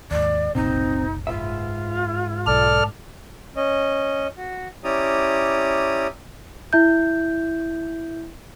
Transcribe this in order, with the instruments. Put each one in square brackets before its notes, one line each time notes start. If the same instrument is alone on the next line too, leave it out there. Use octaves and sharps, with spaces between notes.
[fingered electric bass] D#2 G#2 [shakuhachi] D5
[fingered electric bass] F#1 C2 A#2 [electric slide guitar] C4 [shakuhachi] D#4
[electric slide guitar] G#2 B4 E5 [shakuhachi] F4
[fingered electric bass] B1 [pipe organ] A4 D5 F6
[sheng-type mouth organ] C#4 D#5
F#4
C#4 E4 G4 D5 A#5 D#6
[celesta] E4 E5 G6